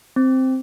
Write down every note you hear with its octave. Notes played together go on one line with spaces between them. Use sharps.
C4